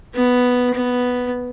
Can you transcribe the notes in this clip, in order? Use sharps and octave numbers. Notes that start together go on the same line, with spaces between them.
B3
B3